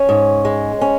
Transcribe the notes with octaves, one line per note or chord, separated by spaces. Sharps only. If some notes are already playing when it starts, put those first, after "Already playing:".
Already playing: C#4 C#5
G#2
G#3
C#4